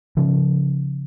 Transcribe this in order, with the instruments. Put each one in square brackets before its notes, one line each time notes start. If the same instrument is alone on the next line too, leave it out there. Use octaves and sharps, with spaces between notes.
[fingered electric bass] C#3 F3